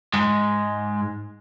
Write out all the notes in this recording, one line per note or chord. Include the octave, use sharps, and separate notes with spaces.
G#2 G#3